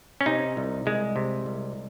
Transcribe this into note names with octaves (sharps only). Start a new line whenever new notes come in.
C#4
C3 D#4
C2
C2 G#3
C3
C2